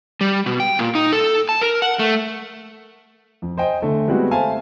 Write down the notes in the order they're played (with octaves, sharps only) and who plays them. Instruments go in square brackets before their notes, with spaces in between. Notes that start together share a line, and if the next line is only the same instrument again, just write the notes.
[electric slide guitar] G3
B2
G5
A#2
D#4
A4
A5
A#4
F#5
A3
[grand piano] F2
C5 D#5 G5 G#5
D3 A3
G3 G#3 B3 C4 F#4
A3 C5 E5 F5 G#5 A5